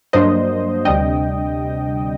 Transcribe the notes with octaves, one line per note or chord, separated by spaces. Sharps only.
G2 F#3 A#3 D4 C5 D#5
D2 C3 G3 D4 D#5 G5